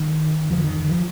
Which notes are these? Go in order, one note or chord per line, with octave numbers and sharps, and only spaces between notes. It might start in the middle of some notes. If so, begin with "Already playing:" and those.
Already playing: D#3
F2 D3 F3
D#3
D#3
F3